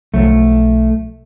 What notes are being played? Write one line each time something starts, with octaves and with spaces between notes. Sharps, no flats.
B1 F3 F#3 A3